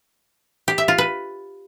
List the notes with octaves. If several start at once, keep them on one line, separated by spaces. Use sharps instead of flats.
G4
E5
F4
B4